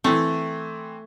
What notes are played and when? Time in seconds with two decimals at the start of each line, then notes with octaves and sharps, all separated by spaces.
0.04 E3 A3 C4